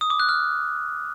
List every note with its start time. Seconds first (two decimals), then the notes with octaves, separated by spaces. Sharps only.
0.01 D#6
0.10 D6
0.20 F#6
0.29 F6